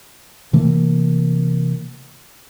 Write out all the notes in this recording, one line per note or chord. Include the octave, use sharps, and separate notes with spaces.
C3 E3 A3 A#3